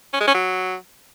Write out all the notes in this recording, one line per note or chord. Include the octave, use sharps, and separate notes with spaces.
C#4
G#3
C#4
F#3